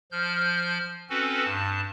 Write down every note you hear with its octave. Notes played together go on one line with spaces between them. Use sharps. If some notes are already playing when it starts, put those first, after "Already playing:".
F3 F6 G6
C4 C#4 F#4 A4 B4
G2 A5